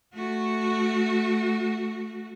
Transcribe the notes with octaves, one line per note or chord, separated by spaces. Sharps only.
A3 F#4